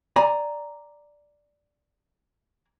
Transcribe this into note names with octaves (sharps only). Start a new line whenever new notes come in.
D5 G#5 A#5